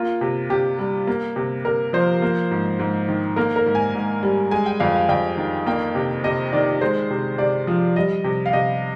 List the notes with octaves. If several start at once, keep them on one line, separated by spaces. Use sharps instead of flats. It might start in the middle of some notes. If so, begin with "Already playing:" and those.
Already playing: A#3 F4
C3
C3 G4
G3
A#3
C3
C3 A#4
F3 C5
A#3
G#2
G#2
D#3
A#3 A#4
A#4
G#2
G#5
G#2
G3
G#3 G#5
G5
F2 F5
F5
F2 G5
D#3
A#3 G5
C3
C3 D#5
D#3 D5
G#3 C5
C3
C3 D5
F3
G3 D#5
C3
F5
C3 D#5